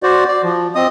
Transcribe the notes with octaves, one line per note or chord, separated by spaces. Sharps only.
F#4 C5 D5
D5
F3
C4 D#5 D#6